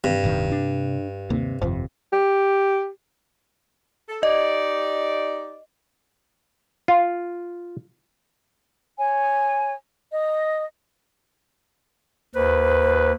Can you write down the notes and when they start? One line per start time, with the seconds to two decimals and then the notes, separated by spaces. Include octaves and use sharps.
0.04 G2 C3
0.24 D1 A2 D#3
0.52 D4
1.30 D#2 C3
1.61 G1 F2 C3 F3
2.13 G4
4.09 A4
4.23 D#4 G4 D5 D#5
6.88 F4
8.97 C#5 G#5
10.10 D#5
12.35 D#2 B4 C5